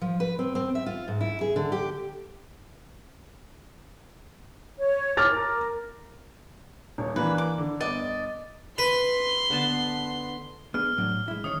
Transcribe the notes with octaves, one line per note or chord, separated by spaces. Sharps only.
F3
B4
C4
C4
E5
F4
G#2
E4
G#4
D3
G4
C#5
E4 C#5 D6 F6 A6
A#4
D#1 C#5
E3 A#3 D4 B4
D6
D3
G1 D5 D#5
B4 C6
D3 B3 A5
B3 D4 G#4 F6
A2 F#3 D4
G#3 E4
D#3 C#4 C#5 D#6